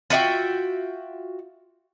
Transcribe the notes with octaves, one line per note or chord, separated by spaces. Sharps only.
F4 F#4 E5 G5